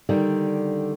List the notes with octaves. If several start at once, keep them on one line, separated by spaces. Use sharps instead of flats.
D3 D#3 G3